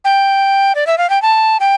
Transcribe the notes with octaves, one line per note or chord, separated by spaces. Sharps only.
G5
D5
E5
F5
G5
A5
G5